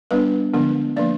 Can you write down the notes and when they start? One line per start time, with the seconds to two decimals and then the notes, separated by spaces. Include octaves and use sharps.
0.11 G3 B3 D4 B4
0.54 D3 F3 G#3 B3 D4
0.96 F3 A#3 D4 D5